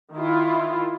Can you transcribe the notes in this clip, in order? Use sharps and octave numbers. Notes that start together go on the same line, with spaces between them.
D#3 E4 F4